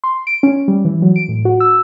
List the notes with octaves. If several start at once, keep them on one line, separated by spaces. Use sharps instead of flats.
C6
D7
C#4
G3
E3
F#3
D7
A2
F#4
E6